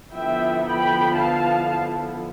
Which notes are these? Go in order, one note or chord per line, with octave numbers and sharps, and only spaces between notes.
D3 F3 B3 E4 E5 G5
G5 B5
F5 A5